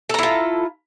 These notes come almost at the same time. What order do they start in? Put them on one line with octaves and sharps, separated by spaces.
A4 A#5 E4 F4